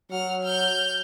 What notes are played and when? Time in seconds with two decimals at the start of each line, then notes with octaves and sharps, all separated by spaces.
0.10 F#3 F#5 F6
0.44 F6 G6